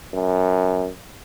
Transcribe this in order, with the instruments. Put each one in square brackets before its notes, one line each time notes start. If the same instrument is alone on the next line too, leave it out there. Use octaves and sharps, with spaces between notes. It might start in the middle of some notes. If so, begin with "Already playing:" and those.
[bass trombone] F#2